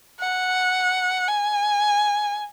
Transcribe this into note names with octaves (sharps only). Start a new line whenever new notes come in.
F#5
G#5